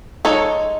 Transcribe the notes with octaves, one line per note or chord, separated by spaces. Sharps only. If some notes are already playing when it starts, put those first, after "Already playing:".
G#3 D#4 A4 C#5